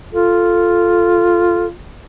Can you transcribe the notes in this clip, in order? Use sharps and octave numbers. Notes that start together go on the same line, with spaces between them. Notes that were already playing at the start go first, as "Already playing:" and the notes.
F4 A4